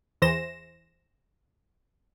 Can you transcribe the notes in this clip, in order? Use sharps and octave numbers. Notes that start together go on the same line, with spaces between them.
E2 E3 C5 A#6 E7